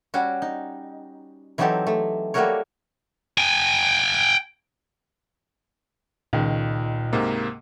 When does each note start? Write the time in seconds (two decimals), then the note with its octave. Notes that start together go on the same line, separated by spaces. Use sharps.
0.14 G3 C#4 F#4
0.42 D#4
1.58 E3 F#3 C4 D#4 G4 A4
1.87 A3
2.34 G3 A3 A#3 F#4 A#4 C#5
3.38 G5 G#5
6.33 C#2 A#2 D#3
7.13 G#2 C3 A#3